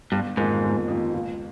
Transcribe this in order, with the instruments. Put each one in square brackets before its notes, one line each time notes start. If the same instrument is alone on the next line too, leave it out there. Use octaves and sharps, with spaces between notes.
[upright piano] G1 [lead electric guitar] G2
[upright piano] F2 D#3 A#3 F4 [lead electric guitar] G#2
[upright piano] G1
F2 D#3 A#3 F4
C#2